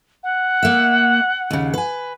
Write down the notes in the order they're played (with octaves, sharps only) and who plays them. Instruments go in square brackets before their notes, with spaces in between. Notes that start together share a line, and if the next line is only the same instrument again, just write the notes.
[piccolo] F#5
[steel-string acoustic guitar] A#3 E5
D#2 C#3
B4 G#5